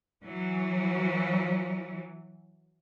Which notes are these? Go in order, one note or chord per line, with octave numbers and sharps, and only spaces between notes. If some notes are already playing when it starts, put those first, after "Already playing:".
E3 F#3